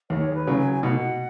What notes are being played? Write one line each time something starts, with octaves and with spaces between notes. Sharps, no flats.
D#2 C#5
G#4
B4
C#3 F#3
G#5
G#5
B2 F#5